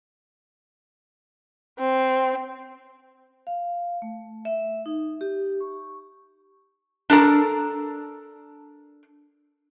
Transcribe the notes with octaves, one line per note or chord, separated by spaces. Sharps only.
C4
F5
A3
E5
D#4
G4
C#6
D4 A4 A#4 A#5